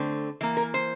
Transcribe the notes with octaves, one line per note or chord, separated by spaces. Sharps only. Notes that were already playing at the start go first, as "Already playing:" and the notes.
Already playing: D3 A3 C4
E3 A#3
A#4
C5